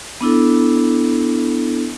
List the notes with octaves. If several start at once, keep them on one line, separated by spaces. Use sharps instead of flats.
B3 D4 E4 A4